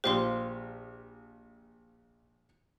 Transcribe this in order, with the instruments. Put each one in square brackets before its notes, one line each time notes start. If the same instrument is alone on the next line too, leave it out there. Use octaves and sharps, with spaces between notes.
[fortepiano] A#1 F4 G4 [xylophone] C5 F5 C6